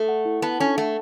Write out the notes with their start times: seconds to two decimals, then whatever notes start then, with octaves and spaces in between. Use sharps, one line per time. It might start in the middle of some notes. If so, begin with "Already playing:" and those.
Already playing: A3 A4
0.09 F#5
0.25 E4
0.42 B3 A5
0.60 C#4 A4
0.77 A3 F#5